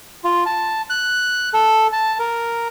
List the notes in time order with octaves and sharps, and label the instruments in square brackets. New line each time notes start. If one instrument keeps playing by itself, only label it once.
[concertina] F4
A5
F#6
A4
A5
A#4